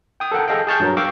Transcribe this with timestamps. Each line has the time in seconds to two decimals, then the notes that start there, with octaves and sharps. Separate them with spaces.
0.20 G5 D#6
0.32 A4 A#4 F#5 G5
0.48 G#4 A4 D#5 F5 G5
0.67 G#4 G5 A5 C#6 F6 G6
0.80 G2 F#3 A#4
0.97 F5 G5 C#6 D6 E6